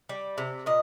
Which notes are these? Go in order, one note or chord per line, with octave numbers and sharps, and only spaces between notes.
G3
C3
A#2 D#5